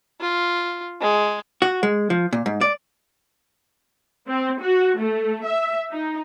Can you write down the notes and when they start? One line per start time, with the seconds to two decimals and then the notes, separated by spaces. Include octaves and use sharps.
0.21 F4
1.01 G#3
1.62 F#4
1.83 G#3
2.10 F3
2.33 A#2
2.46 G#2
2.61 D5
4.27 C4
4.61 F#4
4.98 A3
5.44 E5
5.91 D#4